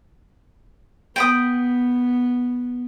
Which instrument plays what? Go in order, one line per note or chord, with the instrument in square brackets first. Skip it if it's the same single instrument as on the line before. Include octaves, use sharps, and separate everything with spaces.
[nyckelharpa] B3 [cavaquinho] G5 B5 D#6